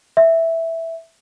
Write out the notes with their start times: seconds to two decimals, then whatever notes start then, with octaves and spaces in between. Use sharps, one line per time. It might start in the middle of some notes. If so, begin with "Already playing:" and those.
0.17 E5